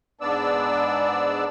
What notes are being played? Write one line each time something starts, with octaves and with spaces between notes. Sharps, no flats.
G#2 B3 D4 D5 E6